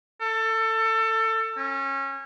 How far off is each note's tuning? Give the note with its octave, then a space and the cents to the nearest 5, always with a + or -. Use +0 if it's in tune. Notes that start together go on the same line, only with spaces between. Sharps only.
A4 +25
C#4 -25